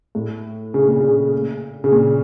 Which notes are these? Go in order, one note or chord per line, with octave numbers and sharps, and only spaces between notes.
A2
C#3
A#2
C#3
C#3
A#2